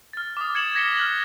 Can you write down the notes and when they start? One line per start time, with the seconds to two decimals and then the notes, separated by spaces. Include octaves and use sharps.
0.13 F6 A6
0.37 D6 D#6
0.55 G#6 C#7 E7 F#7
0.75 G#6 A#6 B6 C#7 F#7 G7
0.97 F6 F#6 F#7